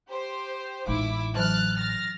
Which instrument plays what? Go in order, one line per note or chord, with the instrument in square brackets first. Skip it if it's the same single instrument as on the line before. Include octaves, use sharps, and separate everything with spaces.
[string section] G4 C5
[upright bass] A1 [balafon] G#3 D#4 [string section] E4 D6
[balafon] E3 F#3 A5 [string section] F6 F#6 A6
[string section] F6 A6 A#6